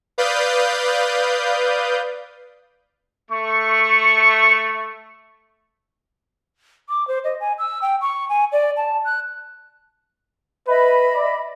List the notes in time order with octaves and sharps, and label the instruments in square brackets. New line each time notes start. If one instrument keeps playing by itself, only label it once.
[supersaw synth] B4 D5 F5 D#6 G6
[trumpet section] A3 C#6
[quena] D6
C5
D#5
G#5
E6
G5
C#6
G#5
D5
A5
F#6
[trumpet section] B4 [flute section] D#5 E5 B5
[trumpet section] D5